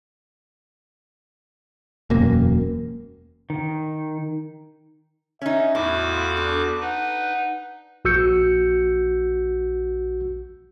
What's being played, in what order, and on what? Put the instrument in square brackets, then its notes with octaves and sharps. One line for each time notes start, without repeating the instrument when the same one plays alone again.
[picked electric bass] E1 F#2 A#3
[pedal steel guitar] D#3
[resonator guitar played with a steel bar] C#4 D#4 [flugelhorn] E5
[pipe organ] E2 F#4 D6 [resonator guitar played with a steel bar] A2 [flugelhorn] E4
[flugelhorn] F4
[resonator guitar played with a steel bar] D4 [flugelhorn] A4
[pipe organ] D#4 B4 [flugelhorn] F#5
[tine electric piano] A#1 F#4 E6 G6 C#7